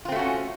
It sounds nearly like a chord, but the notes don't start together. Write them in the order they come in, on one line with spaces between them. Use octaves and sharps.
F4 C4 A3 F#4 C#4